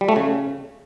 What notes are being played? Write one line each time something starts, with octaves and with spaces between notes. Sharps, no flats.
G3
A3
C#3